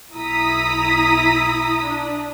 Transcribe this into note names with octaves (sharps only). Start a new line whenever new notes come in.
B1 E4 A#5 D#6 B6
D4